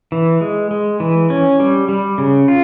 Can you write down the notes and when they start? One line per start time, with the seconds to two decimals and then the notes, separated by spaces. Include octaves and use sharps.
0.12 E3
0.41 G#3
0.71 G#3
1.00 E3
1.30 C#4
1.60 G3
1.89 G3
2.18 C#3
2.48 F4